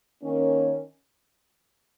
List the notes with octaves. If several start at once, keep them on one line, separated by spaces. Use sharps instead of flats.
D#3 A#3 C#4